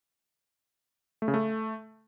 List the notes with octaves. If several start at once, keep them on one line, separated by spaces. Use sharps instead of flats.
A3
C#3
A3